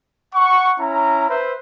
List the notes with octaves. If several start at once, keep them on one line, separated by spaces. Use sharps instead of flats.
F#5 C#6
C#4 E4 A#5
B4 C5 E5